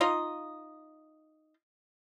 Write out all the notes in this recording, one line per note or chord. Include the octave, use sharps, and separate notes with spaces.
D#4 F4 D#5